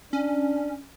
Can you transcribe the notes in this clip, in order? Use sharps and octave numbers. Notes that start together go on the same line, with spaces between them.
C#4 D4